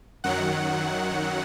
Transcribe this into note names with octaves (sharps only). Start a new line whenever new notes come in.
F#2 D#3 F#3 F#5